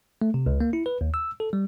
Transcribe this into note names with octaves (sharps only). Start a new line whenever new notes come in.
A3
C3
C#2
A#3
E4
B4
D#2
E6
A4
G3